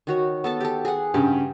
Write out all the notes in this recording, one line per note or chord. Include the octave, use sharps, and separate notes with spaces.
D#3 F#4 C#5
B3 A4 A5
G4 A4
G#4 F#5
G2 C#3 G4